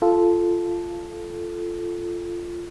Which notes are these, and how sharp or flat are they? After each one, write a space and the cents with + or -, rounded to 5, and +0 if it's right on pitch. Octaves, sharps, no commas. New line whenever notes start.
F4 -10 A4 -10